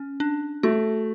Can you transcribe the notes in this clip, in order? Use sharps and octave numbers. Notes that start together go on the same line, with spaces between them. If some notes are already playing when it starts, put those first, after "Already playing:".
Already playing: C#4
D4
A3 F#4